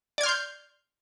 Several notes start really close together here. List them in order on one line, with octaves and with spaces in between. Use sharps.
D5 G#6 F6 C6 G6